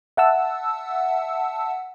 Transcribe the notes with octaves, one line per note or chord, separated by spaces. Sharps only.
E5 F#5 A5 E6